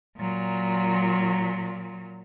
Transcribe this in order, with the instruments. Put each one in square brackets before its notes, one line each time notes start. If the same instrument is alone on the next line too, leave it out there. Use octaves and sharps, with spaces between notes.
[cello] A#2 F#3